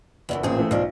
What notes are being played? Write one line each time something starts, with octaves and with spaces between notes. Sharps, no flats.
F#1 E2 C#3 E3
A1 A#2 C4 G#4
E3 A3
B1 F3 D4